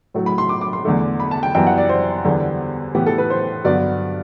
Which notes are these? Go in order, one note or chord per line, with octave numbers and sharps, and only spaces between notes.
A2 F#3 A3
B5
C6
D6
D6
C6
E2 D3 A3
B5
A5
G5
F#2 E3 G3 B3 G5
F#5
D5
C5
E2 D3 G3 B3
A2 E3 B3 G4
A4
B4
C5
G2 D3 F#3 B3 D5